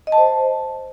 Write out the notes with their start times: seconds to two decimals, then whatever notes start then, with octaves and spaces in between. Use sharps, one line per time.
0.07 D#5
0.12 A5
0.18 C5